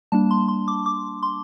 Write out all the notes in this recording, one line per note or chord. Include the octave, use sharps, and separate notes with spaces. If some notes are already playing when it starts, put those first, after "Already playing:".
G3 A#3 D4 A5
C6
C6
D6
D6
C6